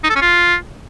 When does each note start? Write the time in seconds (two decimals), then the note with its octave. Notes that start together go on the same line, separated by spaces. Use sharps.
0.04 D#4
0.10 A4
0.16 C#4
0.22 F4